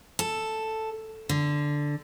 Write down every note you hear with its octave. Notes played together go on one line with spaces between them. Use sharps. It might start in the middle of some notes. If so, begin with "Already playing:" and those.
A4
D3